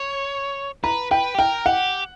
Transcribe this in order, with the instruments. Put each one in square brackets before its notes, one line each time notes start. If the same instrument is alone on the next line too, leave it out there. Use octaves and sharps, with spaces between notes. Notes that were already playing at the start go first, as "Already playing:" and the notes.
Already playing: [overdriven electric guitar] C#5
[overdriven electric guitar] B4 [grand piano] A#5
[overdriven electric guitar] B4 [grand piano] G5
[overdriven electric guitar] G4
[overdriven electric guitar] A#4 [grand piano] G5
[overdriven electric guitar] G4 [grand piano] F#5